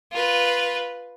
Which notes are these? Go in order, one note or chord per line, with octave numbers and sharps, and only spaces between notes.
F4 B4